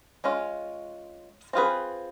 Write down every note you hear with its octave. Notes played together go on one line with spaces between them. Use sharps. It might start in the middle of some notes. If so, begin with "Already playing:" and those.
G#3 C#4 F4
C4 F4 G#4 B4